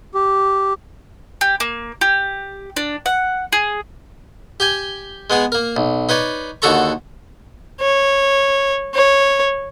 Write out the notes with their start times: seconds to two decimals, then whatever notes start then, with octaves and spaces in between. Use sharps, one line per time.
0.14 G4
1.41 G4
1.60 A#3
2.01 G4
2.76 D4
3.06 F#5
3.52 G#4
4.60 G4 G5 G#5
5.30 G#3 B3 G#4
5.52 A#3 A#4
5.77 B1
6.09 D#4 B4 C#5 D5
6.62 D#2 D3 F#4 A4 A#5 C#6
7.81 C#5
8.94 C#5